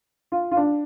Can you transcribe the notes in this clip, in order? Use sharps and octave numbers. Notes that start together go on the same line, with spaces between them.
F4
F4
D4